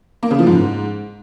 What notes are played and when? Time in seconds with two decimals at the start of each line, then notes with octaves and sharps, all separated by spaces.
0.23 A#3
0.31 C#3
0.39 F3
0.47 G#2